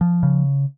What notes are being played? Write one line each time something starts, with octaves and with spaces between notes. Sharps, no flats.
F3
C#3